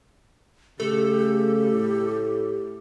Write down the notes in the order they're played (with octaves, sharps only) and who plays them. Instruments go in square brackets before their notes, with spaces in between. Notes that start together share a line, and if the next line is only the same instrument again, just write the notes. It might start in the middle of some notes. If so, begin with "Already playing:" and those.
[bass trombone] C#3 [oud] A3 [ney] G4 [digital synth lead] A4
[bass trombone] A2